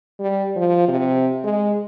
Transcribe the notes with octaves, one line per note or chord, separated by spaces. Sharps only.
G3
F3
C3
G#3